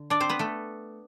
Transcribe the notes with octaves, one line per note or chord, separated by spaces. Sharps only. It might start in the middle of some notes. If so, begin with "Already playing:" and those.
Already playing: D3
D4 D5
C4 C5
B3 B4
A3 A4